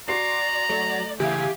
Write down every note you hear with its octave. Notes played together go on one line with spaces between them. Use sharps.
F#4 D5 A#5 C6 C7
F#3 A3
C#3 E3 A3 G4 E5 F5 G#5